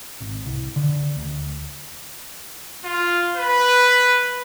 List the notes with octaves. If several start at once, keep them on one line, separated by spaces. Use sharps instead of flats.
G#1
C2
D3
D2
F4
B4